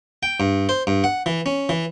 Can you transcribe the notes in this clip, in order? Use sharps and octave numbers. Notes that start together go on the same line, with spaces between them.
G5
G2
C5
G2
F#5
E3
C#4
E3